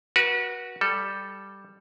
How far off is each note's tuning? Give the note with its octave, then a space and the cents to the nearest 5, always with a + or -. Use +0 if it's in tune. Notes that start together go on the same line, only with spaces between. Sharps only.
F#4 +0 B4 -40
G3 +0 A4 +0